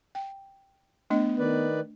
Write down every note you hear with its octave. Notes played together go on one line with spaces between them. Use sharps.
G5
A3 B3 D4 D#5
D#3 B4 D5